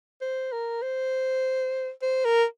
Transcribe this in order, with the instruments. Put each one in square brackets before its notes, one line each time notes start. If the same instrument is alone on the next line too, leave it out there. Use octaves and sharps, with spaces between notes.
[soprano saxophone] C5
A#4
C5
C5
A#4